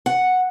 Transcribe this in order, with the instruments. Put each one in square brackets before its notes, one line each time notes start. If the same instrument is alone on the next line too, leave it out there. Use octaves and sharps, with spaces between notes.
[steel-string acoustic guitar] F#5